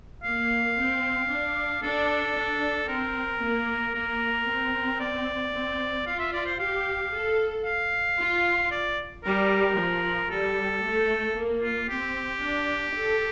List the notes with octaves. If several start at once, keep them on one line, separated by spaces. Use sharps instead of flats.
A#3 F5
C4
D4
D4 A4
D4
C4 A#4
A#3
A#3 A#4
C4
D5
C4
F4 F5
E5
D5
C5
G4 F5
A4
F5
F4
D5
G3 A#4
F3
G3 A4
A3
A#3
F4
C4 G4
D4
A4